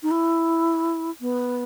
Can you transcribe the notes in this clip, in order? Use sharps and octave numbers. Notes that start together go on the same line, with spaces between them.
D#4
E4
B3